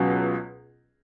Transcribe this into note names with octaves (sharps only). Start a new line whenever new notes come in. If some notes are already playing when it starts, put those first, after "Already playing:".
Already playing: C#2 B2 F#3 C#4